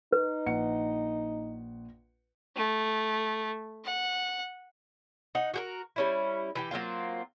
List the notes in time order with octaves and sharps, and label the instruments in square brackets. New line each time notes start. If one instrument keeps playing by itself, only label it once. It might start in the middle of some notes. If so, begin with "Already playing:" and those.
[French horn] D#4 [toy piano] B4
[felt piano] A#1 F#5 C#7
[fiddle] A3
F#5
[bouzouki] D#4 F#5
F#4 G4 A#4
G3 C#4 E4
E3 G4 G5
F#3 A#3 C4 F4